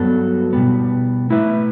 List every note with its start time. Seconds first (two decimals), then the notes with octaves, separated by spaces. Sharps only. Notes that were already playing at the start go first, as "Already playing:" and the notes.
Already playing: G2 F#3 B3 F#4 A4
0.53 B2 G3 B3
1.30 A3 E4 B4 E5